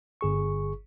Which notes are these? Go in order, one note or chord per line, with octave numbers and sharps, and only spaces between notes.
G1 G#4 C#6